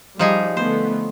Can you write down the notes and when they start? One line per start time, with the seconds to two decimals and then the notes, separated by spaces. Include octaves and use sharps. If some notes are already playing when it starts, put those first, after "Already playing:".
0.19 F3 G3 D#4 G#4
0.57 D3 A3 B3 C5